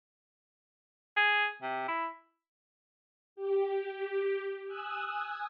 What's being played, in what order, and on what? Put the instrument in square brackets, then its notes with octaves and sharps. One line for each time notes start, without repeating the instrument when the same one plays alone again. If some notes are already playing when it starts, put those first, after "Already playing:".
[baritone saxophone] G#4
C3
E4
[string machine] G4
G#5 D#6 E6 F#6